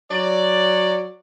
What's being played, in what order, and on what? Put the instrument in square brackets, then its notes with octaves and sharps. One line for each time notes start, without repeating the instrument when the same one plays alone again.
[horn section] F#3 D5